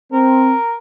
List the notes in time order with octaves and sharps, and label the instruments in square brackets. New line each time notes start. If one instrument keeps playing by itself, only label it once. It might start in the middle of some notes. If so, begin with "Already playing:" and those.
[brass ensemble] C4 [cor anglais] A#4